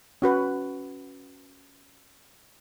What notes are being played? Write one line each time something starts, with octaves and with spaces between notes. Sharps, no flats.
C#4 F#4 B4